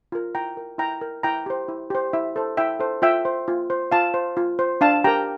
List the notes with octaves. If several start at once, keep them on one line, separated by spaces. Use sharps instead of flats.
F4 A#4
E4 G5 A#5
A#4
E4 G5 A#5
A#4
E4 G5 A#5
G4 C5
E4
G4 C5
E4 E5
A4 C5
E4 E5 G5
A4 C5
F4 E5 G5
C5
F4
C5
F4 F5 A5
C5
F4
C5
D4 F5 A5
G4 A#4 G5 A#5